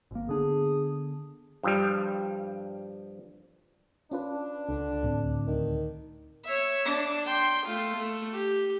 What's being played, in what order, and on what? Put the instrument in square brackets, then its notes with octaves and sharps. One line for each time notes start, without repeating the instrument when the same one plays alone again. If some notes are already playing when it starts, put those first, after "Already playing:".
[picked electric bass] G#1 A#3
[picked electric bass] D3 B3 D4 [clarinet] G#4
[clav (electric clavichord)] G2 F3 G3
[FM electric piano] C#4 F4 B4 [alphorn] D4
[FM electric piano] C#2 [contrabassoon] D3
[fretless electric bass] D2 A2 C4
[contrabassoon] D#3
[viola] C#5 E5
D4
G5 C6
A3 F4
A3
G4